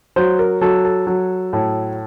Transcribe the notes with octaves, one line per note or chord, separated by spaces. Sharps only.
F#3 C5
A#4
F#3 A4
A4
F#3
A2